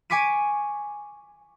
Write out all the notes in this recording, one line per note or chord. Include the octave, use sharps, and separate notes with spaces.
G#5 C#6 D6 B6 D#7